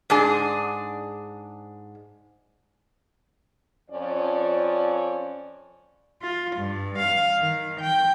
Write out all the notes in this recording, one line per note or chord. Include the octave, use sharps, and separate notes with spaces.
G#2 D4 G#4
F2 F3 C#4 D5
F4
G2
F5
D#3
G5